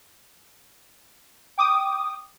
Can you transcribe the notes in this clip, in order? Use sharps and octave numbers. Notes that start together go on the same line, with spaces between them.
G5 D6 D#6